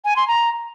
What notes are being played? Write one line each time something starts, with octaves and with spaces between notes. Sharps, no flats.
G#5
C6
A#5